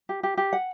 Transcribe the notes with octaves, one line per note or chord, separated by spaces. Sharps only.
G4
G4
G4
F#5